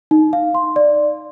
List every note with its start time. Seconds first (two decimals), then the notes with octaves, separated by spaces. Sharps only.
0.11 D#4
0.33 F5
0.55 C6
0.76 D5